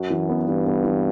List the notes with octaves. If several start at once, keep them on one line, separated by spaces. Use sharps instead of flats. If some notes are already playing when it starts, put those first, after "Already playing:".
Already playing: F#2 F#4
E3
B3
G2 E3
B3
E3